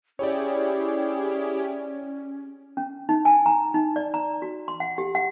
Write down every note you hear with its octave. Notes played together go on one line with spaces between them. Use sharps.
C#4 E4 G4 G#4 C#5 D5
C#4
D#4
G#5
A#5
D#4
D5
A#5
F#4
C6
F#5
G4
F#5